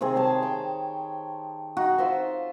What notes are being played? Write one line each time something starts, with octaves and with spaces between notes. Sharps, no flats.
C3 D#3 C4 G#4
G#4 C5 C#5 A5
G5
D#4 F#4
F4 C5 E5 C6